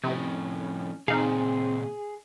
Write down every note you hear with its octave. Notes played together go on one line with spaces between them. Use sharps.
F2 A2 C3 C#4
A#2 C#3 C4 D#4 G#4 F5